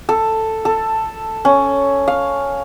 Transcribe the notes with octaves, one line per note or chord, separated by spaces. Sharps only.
A4
A4
C#4
F5